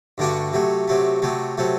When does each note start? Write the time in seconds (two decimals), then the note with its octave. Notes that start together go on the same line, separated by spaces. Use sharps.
0.18 G2 D3 A3 D4 F#4
0.53 C3 F#3 A3
0.88 C3 F#3 A3
1.22 C3 F#3 A3
1.58 C3 F#3 A3